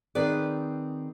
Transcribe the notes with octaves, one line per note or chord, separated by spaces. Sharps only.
D#3 C4 G#4 B4 D5